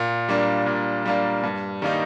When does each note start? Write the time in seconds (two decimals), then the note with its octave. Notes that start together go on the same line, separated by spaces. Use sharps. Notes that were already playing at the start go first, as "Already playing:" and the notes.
Already playing: A#2
0.29 G3 A#3 D4
0.66 A#2
1.05 G3 A#3 D4
1.43 G2
1.82 D#3 G3 A#3 D#4